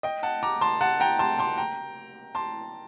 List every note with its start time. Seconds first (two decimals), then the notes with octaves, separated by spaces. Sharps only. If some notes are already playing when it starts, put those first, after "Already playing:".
0.03 D#5 G5
0.23 F#5 A5
0.43 A#5 D6
0.61 A5 C6
0.81 F#5 A5
1.00 G5 A#5
1.19 A5 C6
1.39 A5 C6
1.58 G5 A#5
2.35 A5 C6